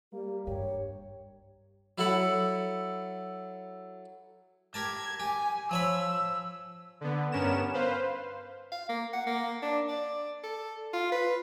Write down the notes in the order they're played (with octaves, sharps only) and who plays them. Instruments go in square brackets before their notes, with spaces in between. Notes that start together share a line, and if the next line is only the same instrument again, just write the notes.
[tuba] G3 [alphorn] A#3 [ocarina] G4
[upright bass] G2 [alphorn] G4 [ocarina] C#5
[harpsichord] F#3 E4 A4 F#5 B5
[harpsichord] G4 A#4 A5 [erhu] G#6
[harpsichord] G4 [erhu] G#5
[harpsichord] F3 C#5 B5 [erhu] E6
[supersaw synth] D3 B3
G2 B3 C#4 A#4 E7
B4 C5 F5
[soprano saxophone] F5
A#3
F#5
A#3
D4
D5
A4
F4
B4